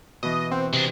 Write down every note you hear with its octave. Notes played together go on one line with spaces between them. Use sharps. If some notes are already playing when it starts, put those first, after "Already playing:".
B2 E3 D#5
C4 F#5
C3 G#3 D4